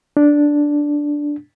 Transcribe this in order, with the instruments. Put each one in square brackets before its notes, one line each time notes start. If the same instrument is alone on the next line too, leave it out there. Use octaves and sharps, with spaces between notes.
[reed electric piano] D4